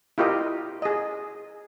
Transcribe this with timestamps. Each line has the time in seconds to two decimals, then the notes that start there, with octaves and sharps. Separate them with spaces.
0.18 E4 F4 G4 A#4 D#5
0.82 G#4 D#5